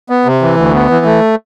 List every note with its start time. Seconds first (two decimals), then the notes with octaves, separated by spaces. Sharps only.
0.10 B3
0.25 C3
0.42 E3
0.57 D2
0.74 B3
0.90 E3
1.06 A3